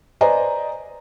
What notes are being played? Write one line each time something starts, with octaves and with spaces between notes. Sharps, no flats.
B4 C5 D5 D#5 G#5 A#5